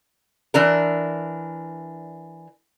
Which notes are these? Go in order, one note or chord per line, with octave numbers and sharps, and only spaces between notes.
E3 D4 A#4